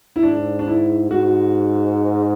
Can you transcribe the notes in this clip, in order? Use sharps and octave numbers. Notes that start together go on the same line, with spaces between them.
E4
G#2 D4
D4
E4
G#2 F#4